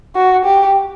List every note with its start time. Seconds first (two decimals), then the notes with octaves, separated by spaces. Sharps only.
0.16 F#4
0.45 G4